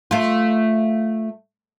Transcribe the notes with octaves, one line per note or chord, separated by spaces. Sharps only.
A3 F4